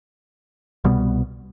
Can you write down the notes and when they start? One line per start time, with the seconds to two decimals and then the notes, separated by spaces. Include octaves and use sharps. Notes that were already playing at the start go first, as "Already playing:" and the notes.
0.84 C2 B2 G3 B3